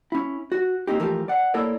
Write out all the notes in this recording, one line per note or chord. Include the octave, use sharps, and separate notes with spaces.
C#4 E4
F#4
A#3 C4 D#4 G4
E3 F3 A3 G4 A#4
D5 F#5
A#3 E4 A4 A#4 C#5 D5